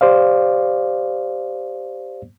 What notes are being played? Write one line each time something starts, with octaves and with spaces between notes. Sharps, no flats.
G4 C5 D5 F5